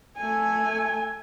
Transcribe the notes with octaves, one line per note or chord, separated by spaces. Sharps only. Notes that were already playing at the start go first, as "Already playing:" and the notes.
A3 G#5